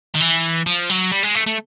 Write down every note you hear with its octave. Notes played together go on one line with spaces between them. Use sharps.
D#3
E3
F3
F#3
G3
G#3
A3
A3